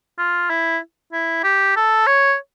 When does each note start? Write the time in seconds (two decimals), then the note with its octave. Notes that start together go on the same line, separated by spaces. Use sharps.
0.18 F4
0.50 E4
1.13 E4
1.43 G4
1.76 A4
2.07 C#5